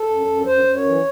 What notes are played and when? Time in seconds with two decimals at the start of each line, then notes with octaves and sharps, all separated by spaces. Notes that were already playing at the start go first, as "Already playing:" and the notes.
Already playing: A4
0.09 F#2
0.27 F#2
0.46 F#2 C5
0.65 F#2
0.74 C#5
0.84 E3